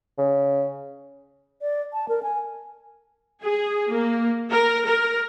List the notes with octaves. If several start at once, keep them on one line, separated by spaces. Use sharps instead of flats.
C#3
D5
A5
A#4
G#5
G#4
A#3
A#4
A#4